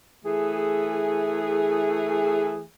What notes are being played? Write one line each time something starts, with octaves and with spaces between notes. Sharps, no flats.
E3 A3 G#4